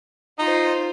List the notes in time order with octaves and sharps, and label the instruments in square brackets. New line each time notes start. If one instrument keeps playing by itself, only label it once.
[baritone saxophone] D#4 [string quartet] F4 C5